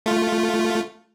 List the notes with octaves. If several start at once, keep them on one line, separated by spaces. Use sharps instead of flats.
A3 F4